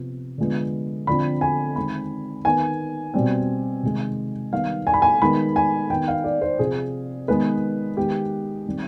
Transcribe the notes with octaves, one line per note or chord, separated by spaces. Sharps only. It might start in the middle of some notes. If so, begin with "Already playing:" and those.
Already playing: C3 F3 B3
D3 F3 G#3 B3
D3 F3 C4 B5
G#5
D#3 G#3 C4 B5
D#3 B3 G#5
B2 G3 C4
C3 D#3 G#3
D#3 G3 B3 F5
G#5
B5
G#5
D#3 G#3 B3 B5
G#5
D#3 B3 G5
F5
D5
C5
C3 F3 C4 G#4
D#3 G#3 B3 B4
D#3 G#3 B3 G4
D#3 G3 C4